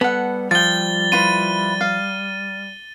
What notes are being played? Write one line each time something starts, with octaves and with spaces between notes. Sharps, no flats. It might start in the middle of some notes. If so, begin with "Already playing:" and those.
G3 B3 A4 F#5
F3 F4 G5 A6 G7
E4 F4 B4 D#7
F5